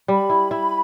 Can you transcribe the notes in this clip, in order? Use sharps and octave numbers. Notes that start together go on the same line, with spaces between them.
G3 B5
E4
E4